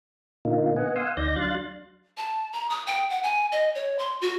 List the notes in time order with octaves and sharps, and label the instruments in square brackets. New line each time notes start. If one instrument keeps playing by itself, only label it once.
[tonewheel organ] A#2 D3 A#3 D#4 F4
B3 D#5 F#5 G#5
F5 F#5 G#5 C6 D#6 E6
D2 D#4 D5 G6 A#6
F#3 D4 F5 C6 F#6 A6
[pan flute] A5
A#5
D#6
G5
F#5
G#5
D#5
C#5
C6
F#4